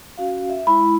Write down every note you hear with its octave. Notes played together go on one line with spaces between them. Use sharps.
C#4 F#4 F5
E5
G#3 E4 B5